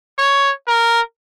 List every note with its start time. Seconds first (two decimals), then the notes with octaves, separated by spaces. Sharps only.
0.18 C#5
0.67 A#4